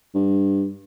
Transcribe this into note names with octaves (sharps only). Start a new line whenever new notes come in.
G2